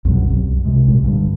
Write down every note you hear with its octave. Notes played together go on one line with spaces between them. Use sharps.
C2 F#2 B2 F#3
C2
C3 G#3
C2 A#2
G2 D3